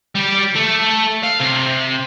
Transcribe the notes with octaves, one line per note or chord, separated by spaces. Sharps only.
G3 G4
A3
F5
C3